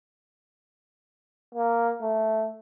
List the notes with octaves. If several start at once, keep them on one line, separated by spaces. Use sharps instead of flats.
A#3
A3